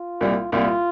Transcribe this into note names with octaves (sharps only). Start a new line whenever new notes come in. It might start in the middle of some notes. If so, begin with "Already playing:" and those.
Already playing: F4
C2 A#2 G3
C2 A#2 G3 F4